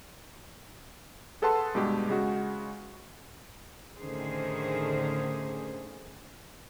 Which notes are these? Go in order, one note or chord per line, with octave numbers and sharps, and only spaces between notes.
G#4 A4 B4 F#5 A5 C6
G2 B2 G#3 G4
C#3 G#3 F#4
A2 D3 D#3 C#4 G#4 C5